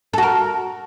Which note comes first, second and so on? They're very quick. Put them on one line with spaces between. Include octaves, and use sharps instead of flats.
A4 F#4 A#4